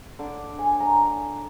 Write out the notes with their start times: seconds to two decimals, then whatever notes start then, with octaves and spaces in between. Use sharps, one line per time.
0.19 D3
0.59 G#5
0.80 A#5